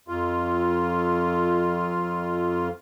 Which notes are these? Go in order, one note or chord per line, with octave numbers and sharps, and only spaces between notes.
F2 F4